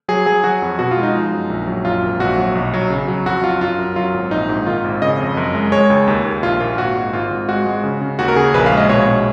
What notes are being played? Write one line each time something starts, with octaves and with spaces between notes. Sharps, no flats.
F#3 G#4
F#3 G#4
F#3 F#4
F2
B2 F#4
F4
G#3
D#4
F3
F#2
A#1
F#3
F#2 F4
G#1
A#1 F#4
F#3
B1
F#3
C#3
F#3
F2 F#4
F#3 F4
F#2 F4
F#2
F#3 F4
G#1
A#1 D#4
G#2
D#3 F4
G#1
C#3 D#5
F2
F#2
G#3
G#3 C#5
C#2
D#2
D#2
A#1 F4
A#2 F4
G#1 F#4
G#2
G#1 F4
G#1
G#3 F#4
G#3
C#3
C#3
D#2 F#4
A#4
C#3 G#4
A#1 B4
F5
G#3
D#5
B2 C#5
B2